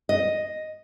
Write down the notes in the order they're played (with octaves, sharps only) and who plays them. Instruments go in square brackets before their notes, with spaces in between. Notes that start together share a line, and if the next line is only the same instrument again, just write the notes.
[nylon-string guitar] D#5